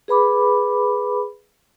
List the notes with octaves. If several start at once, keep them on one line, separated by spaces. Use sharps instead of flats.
G#4 B4 B5 D6